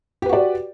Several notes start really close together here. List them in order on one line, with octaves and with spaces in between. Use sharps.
G4 B4 F#4 D5